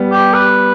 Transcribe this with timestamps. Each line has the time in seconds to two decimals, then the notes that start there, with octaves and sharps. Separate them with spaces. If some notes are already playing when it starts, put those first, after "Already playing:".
Already playing: G3 B3
0.12 G4
0.34 B4